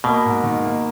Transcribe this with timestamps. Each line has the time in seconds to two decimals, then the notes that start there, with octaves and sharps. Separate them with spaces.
0.04 B2 A#3
0.25 G#2
0.44 D#3
0.63 A#3